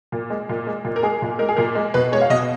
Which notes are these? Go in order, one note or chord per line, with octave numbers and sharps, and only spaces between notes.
A#2
G#3
A#2
G#3
A#2
A#4
G#3 G#4
A#2
G#3 A#4
G#4
A#2 A#4
G#3
B2 B4
G#3 C#5
F5
B2 D#5